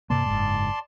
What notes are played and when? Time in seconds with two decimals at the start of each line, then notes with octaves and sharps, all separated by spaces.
0.10 G2 C3 A#3 D5 A5 C6
0.26 F#1 G#2